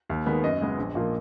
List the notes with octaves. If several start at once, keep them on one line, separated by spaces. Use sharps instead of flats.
D#2
D#3 G#3 B3
F#2 D#5
C#3 G#3 B3
A#1
A#2 F3 A#3